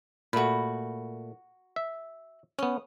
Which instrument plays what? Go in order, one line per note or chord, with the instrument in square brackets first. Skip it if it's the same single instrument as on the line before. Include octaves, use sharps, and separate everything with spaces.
[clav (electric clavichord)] A#2 A3 [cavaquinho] F#4 B5
[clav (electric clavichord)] E5
[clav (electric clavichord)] B3 C#4 [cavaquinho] D#6